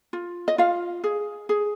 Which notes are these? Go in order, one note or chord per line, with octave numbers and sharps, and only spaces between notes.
F4
D#5
F4 F5
G#4
G#4